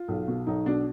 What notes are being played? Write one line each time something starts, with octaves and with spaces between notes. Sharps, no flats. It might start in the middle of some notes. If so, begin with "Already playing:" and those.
Already playing: F4
B1
B2
B1 D#4
B2 D4